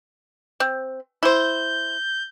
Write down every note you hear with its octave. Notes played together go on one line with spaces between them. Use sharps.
C4
E4 C5 G6